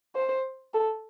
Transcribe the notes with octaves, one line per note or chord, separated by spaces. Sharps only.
C5
A4